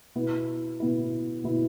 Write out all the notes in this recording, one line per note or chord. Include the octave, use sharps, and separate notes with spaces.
B2 B3 E4
B2 B3 E4
B2 B3 E4